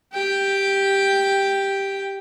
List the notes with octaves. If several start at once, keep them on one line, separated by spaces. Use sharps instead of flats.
G4 G5